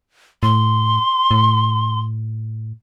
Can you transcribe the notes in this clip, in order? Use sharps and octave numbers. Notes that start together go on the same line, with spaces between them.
A2 C6
A2